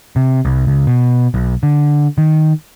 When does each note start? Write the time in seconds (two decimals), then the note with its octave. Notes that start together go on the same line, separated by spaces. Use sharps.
0.16 C3
0.45 C2
0.67 C#2
0.87 B2
1.34 B1
1.63 D3
2.18 D#3